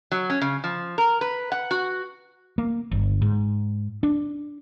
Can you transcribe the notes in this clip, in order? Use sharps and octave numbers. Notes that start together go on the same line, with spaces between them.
F#3
C#4
C#3
F3
A#4
B4
F#5
F#4
A#3
G1
G#2
D4